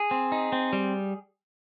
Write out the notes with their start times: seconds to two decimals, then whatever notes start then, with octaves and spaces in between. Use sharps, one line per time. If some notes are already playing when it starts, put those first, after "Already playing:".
Already playing: G#4
0.11 C4
0.32 D#4
0.52 C4
0.73 G3